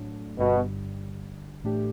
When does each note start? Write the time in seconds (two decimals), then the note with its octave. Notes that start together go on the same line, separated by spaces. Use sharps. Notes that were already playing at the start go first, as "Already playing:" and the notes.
Already playing: A2 F#3 A3 D4
0.38 G1 G2 B2 D3 G3
1.64 A2 E3 A3 D4 G4